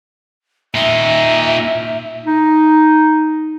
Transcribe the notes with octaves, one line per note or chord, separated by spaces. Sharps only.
A#2 D#4 E5
D#4